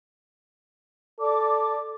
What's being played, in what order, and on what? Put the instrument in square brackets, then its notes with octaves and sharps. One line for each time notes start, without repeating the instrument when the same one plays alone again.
[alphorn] A4 [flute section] D5 D6